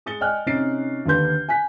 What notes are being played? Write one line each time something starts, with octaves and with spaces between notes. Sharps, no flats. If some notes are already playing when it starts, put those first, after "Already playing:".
G#3 D#6 A6 C#7 G7
D5 D#5 G5 G#5 F6 F#6
C3 C#4 D#4 A6 C7 D7
D#2 D3 D4 B4 C6 G6
G#5 F#6 B6